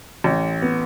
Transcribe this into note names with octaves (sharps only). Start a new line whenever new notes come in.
A1
B3